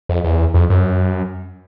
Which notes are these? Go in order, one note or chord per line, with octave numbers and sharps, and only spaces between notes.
F2
E2
F2
F#2